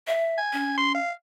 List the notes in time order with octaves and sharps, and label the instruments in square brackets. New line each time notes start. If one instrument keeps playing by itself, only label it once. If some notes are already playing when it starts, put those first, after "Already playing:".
[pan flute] E5
[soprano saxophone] G#5
[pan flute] C#4
[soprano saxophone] C6
F5